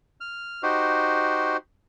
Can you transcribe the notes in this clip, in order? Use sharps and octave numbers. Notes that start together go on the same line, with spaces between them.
F6
D#4 F#4 G4 C5